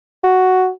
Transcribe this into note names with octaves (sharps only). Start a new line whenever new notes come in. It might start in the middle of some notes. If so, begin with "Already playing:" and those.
F#4